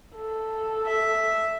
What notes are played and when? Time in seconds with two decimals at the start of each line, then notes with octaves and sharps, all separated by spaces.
0.16 A4
0.86 E5